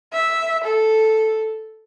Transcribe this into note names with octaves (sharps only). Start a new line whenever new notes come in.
E5
A4